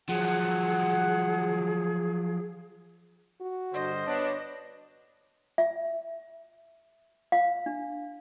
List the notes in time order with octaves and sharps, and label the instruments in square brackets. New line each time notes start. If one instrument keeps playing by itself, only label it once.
[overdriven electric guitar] F3 F#3 [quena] G#4 [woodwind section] F#5
[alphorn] F#4
[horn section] G2 D3 C5 [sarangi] D#5
[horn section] B3 D4 [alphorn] C#5
[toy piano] E5
F5
D4